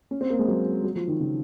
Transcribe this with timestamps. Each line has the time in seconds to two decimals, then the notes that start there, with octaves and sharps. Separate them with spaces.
0.11 C#4
0.21 C4
0.30 A#3
0.39 G#3
0.48 F#3
0.84 F#3
0.95 F3
1.07 D#3
1.20 C#3